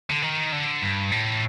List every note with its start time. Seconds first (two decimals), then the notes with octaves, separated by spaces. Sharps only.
0.10 D3
0.22 D#3
0.52 D3
0.82 G2
1.11 A2